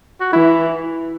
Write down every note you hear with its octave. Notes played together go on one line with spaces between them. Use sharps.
F#4
E3 E4